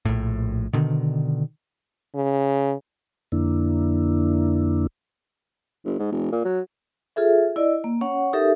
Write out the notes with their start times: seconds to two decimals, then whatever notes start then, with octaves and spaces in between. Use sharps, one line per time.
0.05 A#1 A2
0.73 B2 D3 D#3
2.15 C#3
3.32 F2 D3 A#3 D4 E4
5.85 G1
5.99 G#2
6.12 F1
6.32 A#2
6.45 F#3
7.16 F4 G#4 A4 E5
7.56 E4 D5 D#5
7.84 A#3
8.01 C#4 C#5 F#5
8.33 D#4 G4 A4 A#4 E5